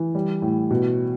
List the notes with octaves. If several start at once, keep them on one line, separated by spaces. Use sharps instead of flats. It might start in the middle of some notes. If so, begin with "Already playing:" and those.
Already playing: E3
G3
A2
B2